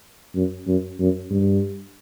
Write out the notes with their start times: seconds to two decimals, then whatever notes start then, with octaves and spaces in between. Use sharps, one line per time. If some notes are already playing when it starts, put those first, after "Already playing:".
0.35 F#2
0.67 F#2
1.00 F#2
1.31 G2